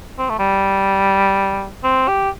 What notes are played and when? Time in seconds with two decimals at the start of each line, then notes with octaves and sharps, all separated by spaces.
0.19 C4
0.29 A3
0.39 G3
1.83 C4
2.08 G4